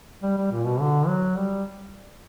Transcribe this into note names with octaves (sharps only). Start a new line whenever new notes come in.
G3
G3
A#2
B2
D3
F#3
G3